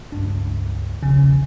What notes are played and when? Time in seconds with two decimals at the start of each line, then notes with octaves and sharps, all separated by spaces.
0.12 C#2 G2 D4
1.03 E1 A#1 C#3 C#4